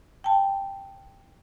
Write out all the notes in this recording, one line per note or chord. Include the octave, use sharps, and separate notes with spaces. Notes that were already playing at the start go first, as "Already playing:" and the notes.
G5 A5